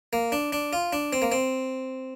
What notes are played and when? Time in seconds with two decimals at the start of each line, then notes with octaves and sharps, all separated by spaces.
0.13 A#3
0.32 D4
0.53 D4
0.73 F4
0.93 D4
1.13 C4
1.22 A#3
1.32 C4